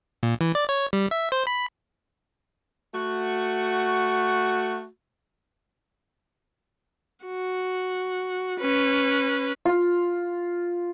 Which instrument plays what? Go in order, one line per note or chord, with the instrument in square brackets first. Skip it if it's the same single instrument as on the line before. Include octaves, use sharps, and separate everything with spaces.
[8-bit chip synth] A#2
E3
D5
C#5
G3
E5
C5
B5
[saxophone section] A3 F#4
[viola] F#4
C#4 B4
[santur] F4